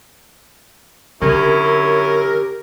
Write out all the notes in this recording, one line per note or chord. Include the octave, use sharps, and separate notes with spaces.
F#2 D3 C#4 E4 G4 A#4